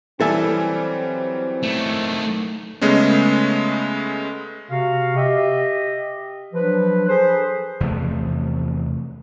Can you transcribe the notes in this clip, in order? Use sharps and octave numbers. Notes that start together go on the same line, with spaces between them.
E3 F#3 G3 C4 A4 E5 G#5
D#3 A3
C#3 G#3 A3 B3 C#4
C3 F#4 F5
G4 D#5 E5
F3 F#3 D4 B4
G#4 A4 B4 C5
E2 C3 F3 A3